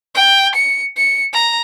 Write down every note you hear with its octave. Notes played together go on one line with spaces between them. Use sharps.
G5
C#7
C#7
A#5